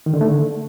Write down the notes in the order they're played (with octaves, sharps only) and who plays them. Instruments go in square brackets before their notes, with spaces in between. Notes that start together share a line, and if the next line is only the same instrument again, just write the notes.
[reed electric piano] D#3
D3
A3
D3